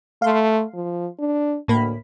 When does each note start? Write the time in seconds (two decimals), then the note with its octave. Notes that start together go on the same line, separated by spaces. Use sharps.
0.22 A3 F5 C6
0.74 F3
1.19 D4
1.68 D2 A2 A#3 B5